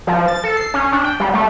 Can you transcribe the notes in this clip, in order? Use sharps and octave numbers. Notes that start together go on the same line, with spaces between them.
F3
A6
A4
C7
C#4
D4
G5
G3
A3